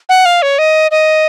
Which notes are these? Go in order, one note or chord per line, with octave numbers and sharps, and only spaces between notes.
F#5
F5
C#5
D#5
D#5